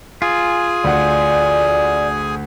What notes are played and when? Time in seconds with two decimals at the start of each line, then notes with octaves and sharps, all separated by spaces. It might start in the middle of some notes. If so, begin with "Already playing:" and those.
0.22 F4 G#4 G#5
0.84 D2 D5 F#5